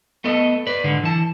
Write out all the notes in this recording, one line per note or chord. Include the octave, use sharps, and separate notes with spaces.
A3 B3 A4 D#5
B4 D5
G#2 D3 G#3
E3 A5